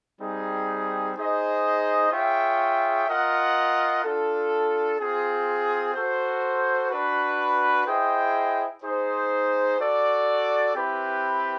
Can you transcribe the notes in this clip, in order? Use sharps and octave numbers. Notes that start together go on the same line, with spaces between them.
G3 C4 D#4 G#4
D#4 G#4 C5 D#5
F4 G#4 C#5 E5 G5
F4 A#4 D#5 F#5
D4 F4 A4
C4 F4 G#4
F#4 A4 C5
D4 F#4 B4
E4 G#4 C5 D#5 G5
D#4 G#4 C5
F#4 A4 D5
C4 E4 G4 B4